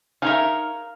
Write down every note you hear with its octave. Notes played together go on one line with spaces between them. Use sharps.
D#4 G#4 A#4 C#5 E5 F5